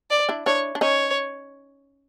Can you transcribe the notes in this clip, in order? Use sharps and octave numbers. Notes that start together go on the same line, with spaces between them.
D5
D4 E4
D4 E4 C#5
D4
C#4 D#4 C#5